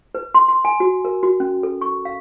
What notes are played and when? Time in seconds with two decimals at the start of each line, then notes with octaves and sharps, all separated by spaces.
0.15 B4
0.35 C6
0.48 C6
0.65 G#5
0.80 F#4
1.05 A#4
1.23 F#4
1.40 C#4
1.63 A4
1.81 C#6
2.05 F5